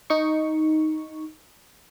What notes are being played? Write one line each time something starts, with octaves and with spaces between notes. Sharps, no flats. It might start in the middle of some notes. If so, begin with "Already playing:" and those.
D#4 C#6